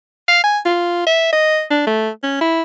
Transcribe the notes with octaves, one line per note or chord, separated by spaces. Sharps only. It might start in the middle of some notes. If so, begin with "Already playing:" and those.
F5
G#5
F4
E5
D#5
D4
A3
C#4
E4